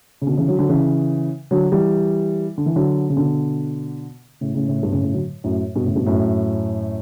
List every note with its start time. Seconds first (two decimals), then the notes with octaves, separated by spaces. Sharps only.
0.22 C#3
0.27 B2 D3
0.37 C#3 E3
0.48 D3 F#3
0.59 D3 F#3
0.69 C#3 E3
1.51 D3 F#3
1.72 E3 G3
2.58 D3
2.66 E3
2.76 D3 F#3
3.10 C#3
3.17 B2 D3
4.41 A2 C#3
4.54 A2 C#3
4.68 A2 C#3
4.83 G2 B2
4.92 A2 C#3
5.03 A2 C#3
5.13 D3 F#3
5.44 F#2 A2
5.76 G2 B2
5.86 A2 C#3
5.96 G2 B2
6.06 F#2 A2